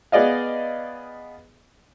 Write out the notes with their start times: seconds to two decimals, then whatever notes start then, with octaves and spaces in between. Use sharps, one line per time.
0.12 B3 G#4 D5 D#5 F5